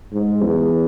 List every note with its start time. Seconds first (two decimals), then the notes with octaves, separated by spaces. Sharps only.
0.13 G#2
0.42 E2